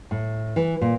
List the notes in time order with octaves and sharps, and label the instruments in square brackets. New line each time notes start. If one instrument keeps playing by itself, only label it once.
[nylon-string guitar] A2
E3
A#2